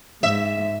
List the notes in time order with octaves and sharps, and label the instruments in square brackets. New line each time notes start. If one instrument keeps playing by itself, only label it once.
[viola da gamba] G#2 [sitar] E5